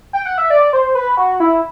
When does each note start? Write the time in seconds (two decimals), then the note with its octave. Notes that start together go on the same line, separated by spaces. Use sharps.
0.13 G5
0.26 F#5
0.38 E5
0.50 D5
0.73 C5
0.95 B4
1.17 F#4
1.40 E4